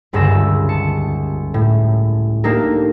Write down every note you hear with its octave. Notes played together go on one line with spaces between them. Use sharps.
D#1 C#2 G2 D3 E6 A#6
A5 C#7
A2
A#3 D4 D#4 G4 A4 A#4